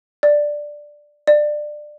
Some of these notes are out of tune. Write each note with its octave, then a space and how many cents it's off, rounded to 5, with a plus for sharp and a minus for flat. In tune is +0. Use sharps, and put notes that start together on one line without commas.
D5 +5
D5 +20